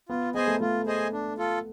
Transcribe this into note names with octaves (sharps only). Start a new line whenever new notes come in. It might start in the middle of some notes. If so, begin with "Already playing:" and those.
B3 F4
B3 G#4 C5 D#5 G#5
A3
A3 F4
G#4 C5 D#5 G#5
D4
F4 A4